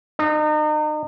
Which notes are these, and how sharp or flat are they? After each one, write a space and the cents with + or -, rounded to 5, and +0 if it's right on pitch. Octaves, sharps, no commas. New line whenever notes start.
D#4 -35